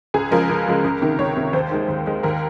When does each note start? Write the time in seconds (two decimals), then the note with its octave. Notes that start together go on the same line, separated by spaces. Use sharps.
0.14 C#2 G#4
0.31 C#3 F3 G#3 A#4
0.50 C#2
0.67 C#3 F3 G#3
0.84 C#2
1.01 C3 D#3
1.19 C#2 C#5
1.37 C3 D#3
1.53 D#2 C5
1.71 D#3 G#3
1.88 D#2
2.06 D#3 G#3
2.23 D#2 A#4